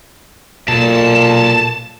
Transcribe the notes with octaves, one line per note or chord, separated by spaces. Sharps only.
B1 A#2 A5